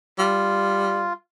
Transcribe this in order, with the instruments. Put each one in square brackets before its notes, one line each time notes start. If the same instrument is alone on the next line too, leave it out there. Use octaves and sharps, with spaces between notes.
[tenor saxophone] G3 [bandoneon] F4